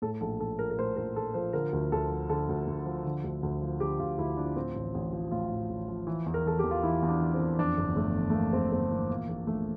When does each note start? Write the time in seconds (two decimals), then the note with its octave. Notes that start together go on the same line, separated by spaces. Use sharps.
0.02 A2 A4
0.21 A#1 A4
0.40 A#1 A4
0.59 F3 A#4
0.71 A#4
0.78 A2 C5
0.96 A#1 A#4
1.16 A#1 A4
1.34 F3 C5
1.53 D3 A#4
1.73 D2
1.92 D2 A4
2.10 F3
2.29 D3 A4
2.49 D2
2.67 D2
2.86 F3
3.05 D3
3.24 D2
3.43 D2
3.62 F3
3.80 D3 G4
3.99 D2 F4
4.18 D2 E4
4.37 F3 D4
4.56 A2 C4
4.76 A1
4.95 A1
5.13 F3
5.31 A2 F4
5.51 A1
5.69 A1
5.88 F3
6.07 E3
6.26 E2
6.34 A#4
6.45 E3 A4
6.59 E2 G4
6.71 F4
6.83 E3 E4
7.02 E2
7.08 D4
7.21 E3
7.34 C4
7.40 E2
7.58 F2 D4
7.78 G1
7.96 G1 A3
8.15 E3
8.30 A3
8.34 F2 A#3
8.53 G1 C4
8.72 G1 C4
8.91 E3 A#3
9.10 A#2 A#3
9.29 A#1
9.47 A#1 A3